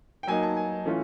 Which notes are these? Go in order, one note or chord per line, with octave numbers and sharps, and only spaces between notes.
G5
F#3 A#3 D#4 G#5
A5
G#5
E3 A3 C#4 F4